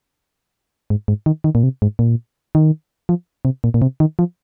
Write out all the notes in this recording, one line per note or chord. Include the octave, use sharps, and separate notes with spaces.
G#2
G#2
D#3
D#3
A#2
C3
G#2
A#2
D#3
F3
C3
A#2
A#2
C3
D#3
F3